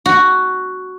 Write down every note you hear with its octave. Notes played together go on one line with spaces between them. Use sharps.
F#4